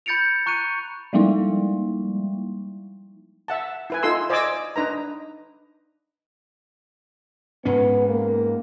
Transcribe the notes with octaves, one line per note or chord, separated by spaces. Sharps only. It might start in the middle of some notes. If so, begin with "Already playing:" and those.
B5 G6 A6 C#7 D7 F7
A#5 C#6 F#6 C#7 D#7
F3 G3 G#3 A#3 D#4 E4
E5 F#5 A5
E4 B4 G#5
D#4 F4 A4 C6 E6
C5 D5 D#5 G#5 D6 E6
D4 D#4 B4 A#5
G#2 B3 C#4
A#3